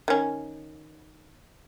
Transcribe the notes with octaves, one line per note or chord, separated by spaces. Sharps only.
D#3 C#4